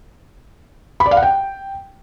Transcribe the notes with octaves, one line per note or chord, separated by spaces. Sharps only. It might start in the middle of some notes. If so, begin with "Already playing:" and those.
B5
D5
F5
F#5
G5